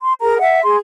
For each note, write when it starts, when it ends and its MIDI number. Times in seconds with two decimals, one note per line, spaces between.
0.01 0.15 84
0.21 0.39 68
0.21 0.39 70
0.21 0.39 82
0.39 0.60 76
0.39 0.60 78
0.64 0.76 68
0.64 0.76 84